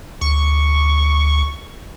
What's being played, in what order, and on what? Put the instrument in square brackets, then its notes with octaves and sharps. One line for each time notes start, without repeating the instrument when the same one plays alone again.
[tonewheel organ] D2 [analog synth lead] C#6